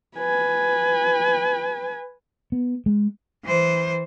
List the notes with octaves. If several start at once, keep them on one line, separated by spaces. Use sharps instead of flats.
B4 G#5
B3
G#3
E3 C5